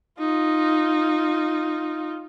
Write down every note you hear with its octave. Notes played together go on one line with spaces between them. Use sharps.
D#4 F4